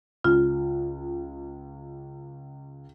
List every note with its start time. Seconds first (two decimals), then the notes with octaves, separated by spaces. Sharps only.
0.24 C#2 F4